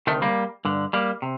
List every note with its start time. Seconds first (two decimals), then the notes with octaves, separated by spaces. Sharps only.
0.07 D2 C3 D#3 A3
0.22 G3 A#3
0.65 G2 D3
0.93 G3 A#3
1.22 C3